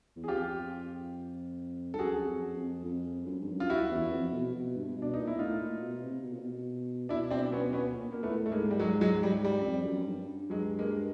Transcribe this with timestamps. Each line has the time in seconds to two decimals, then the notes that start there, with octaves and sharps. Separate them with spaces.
0.16 E2
0.24 G#4
0.28 F2 F4 G4
1.94 G2 A4
1.98 F#2 F#4 G#4
2.27 F2
2.56 F2
2.85 F2
3.26 F#2
3.39 G2
3.52 F#2
3.60 F4
3.70 E4 F#4
3.91 E2
4.12 F2
4.33 B2
4.54 B2
4.76 G2
4.97 B2
5.02 D4
5.14 A#2 D#4
5.27 E4
5.39 A2 D#4 F4
5.60 A#2
5.83 B2
6.03 C3
6.25 B2
6.33 A#2
6.39 B2
7.09 B2 D4 E4
7.30 C4 D4
7.52 B3 C#4
7.73 B3 C#4
7.95 A#2
8.12 A#3
8.23 A2 A3 B3
8.46 A3
8.51 G#2 G#3 A#3
8.71 G3
8.80 F#3 G#3
9.01 F#3 G#3
9.23 G3
9.44 G3
9.60 F#2
9.66 F2
9.86 F#2
10.07 G2
10.50 G2 F#3 G#3
10.79 G#3 A#3